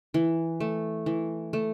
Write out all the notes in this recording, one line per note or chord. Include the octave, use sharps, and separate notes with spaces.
E3
A3
E3
A3